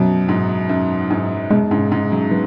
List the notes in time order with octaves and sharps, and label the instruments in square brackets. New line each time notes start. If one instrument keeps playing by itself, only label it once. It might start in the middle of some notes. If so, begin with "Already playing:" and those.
Already playing: [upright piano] F#2 B2 [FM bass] F#3
[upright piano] G#2
F#2
G#2
[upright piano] F#2 B2 [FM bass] G#3
[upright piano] G#2 C#3
G#2 C#3
C#3 F#3
F#3 B3